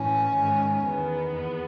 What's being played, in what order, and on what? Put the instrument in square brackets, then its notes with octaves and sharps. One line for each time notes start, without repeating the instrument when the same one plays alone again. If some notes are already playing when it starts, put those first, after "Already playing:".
Already playing: [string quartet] A2 E3 C#4
G#2 D#3
E2 D#3 B3
E2